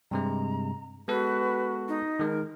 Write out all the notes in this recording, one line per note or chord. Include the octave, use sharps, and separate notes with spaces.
G2 C3 G#3 A#5
G#3 B3 F#4 A4 B4
D#4
D#3 G#3 A#4